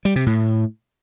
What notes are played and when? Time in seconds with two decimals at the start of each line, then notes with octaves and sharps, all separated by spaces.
0.05 G3
0.16 C3
0.26 A2